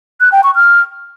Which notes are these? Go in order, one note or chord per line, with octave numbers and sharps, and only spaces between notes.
F#6
G5
C#6
F6